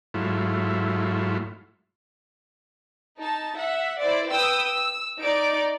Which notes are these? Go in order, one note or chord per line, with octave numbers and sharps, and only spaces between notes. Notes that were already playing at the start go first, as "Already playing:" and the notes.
G#2 F#3 A3 E4 F4
D#4 A5
E5 F#5
E4 C5 D5
B4 G5 D#6 E6
E6
D#4 D5 D7